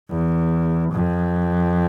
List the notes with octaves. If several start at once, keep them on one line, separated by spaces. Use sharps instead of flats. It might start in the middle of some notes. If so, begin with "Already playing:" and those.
E2
F2